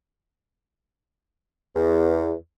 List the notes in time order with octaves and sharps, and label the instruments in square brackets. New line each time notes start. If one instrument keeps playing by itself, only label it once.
[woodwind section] E2